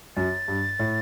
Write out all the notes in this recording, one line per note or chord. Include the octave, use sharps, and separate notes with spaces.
F#2 A6
G2
A2